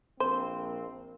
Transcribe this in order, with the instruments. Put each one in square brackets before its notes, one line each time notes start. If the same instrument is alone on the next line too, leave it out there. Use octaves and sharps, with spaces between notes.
[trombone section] A#1 A#3 C4 [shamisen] C5